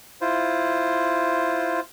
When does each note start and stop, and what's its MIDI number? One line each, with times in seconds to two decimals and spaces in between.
0.21 1.80 64
0.21 1.80 65
0.21 1.80 72